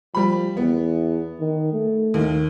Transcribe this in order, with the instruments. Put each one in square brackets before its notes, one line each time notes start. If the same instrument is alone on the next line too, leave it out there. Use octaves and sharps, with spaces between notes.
[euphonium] F3 [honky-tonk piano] G3 B5
[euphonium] E2 [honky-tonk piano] B3
[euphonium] D#3
A3
[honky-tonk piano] D#2 D#3